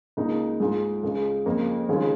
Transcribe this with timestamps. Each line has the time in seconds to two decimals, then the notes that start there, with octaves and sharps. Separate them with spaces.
0.17 C#2 C#3 A#3 D#4
0.60 G#2 G#3 F4
1.03 C#2 C#3 G#3
1.46 F2 C#3 A#3
1.89 D#2 C#3 G#3 F4